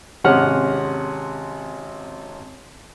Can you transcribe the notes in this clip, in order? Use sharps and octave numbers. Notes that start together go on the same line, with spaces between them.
G#1 C3 C#4 F#5 F6